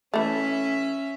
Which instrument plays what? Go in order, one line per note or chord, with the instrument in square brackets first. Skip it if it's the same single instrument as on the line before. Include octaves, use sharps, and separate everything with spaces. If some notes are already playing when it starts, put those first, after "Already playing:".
[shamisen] E3 A3 [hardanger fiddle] C#4 E5